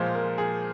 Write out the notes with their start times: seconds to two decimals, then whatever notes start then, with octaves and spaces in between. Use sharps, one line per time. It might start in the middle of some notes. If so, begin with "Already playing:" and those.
Already playing: A#2 F3 G#3 C5
0.15 A#4
0.38 G#4